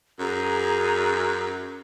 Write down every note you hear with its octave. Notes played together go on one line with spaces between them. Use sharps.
F#2 G#4 A#5